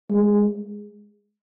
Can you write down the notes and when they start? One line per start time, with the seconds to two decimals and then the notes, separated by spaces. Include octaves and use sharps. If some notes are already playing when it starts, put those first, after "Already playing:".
0.10 G#3